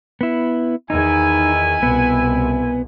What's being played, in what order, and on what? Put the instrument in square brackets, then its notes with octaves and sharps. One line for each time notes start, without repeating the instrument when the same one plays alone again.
[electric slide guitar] B3 E4
[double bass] E2 D#3 [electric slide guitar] D#4 [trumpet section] E4 G#5
[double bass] C2 B2 [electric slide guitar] B3